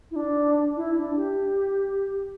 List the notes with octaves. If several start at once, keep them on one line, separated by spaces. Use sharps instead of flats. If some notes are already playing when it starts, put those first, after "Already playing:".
E4
D4
E4
D4
G4